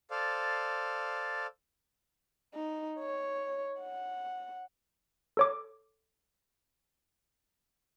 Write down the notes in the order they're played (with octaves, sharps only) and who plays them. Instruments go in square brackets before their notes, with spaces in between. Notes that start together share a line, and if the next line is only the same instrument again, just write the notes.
[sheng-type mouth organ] A4 C5 D5 F5
[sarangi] D#4
C#5
F#5
[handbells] A4 C#5 D6